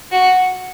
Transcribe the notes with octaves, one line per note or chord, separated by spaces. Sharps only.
F#4